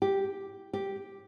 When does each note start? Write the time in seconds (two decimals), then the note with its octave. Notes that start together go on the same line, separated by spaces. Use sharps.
0.02 G4
0.73 G4